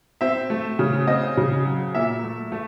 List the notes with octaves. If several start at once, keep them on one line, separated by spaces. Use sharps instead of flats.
C4 E5
A3
C#3
C4 D#5
C#3
F#3
A#2 E5
A3
A3